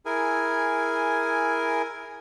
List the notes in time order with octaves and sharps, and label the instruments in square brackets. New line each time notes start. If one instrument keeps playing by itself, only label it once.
[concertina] E4 G#4 A#4 G#5